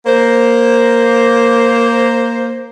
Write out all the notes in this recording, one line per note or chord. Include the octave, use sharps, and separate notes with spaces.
A#3 C5